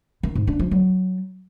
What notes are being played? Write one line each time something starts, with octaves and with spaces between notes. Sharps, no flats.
D#3
G#2
D4
F3
F#3